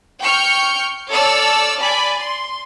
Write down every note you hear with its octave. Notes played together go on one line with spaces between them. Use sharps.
G5 C#6 F6 G6 C#7
A4 C#5 D5 E6 F6
D5 G#5 B5
C6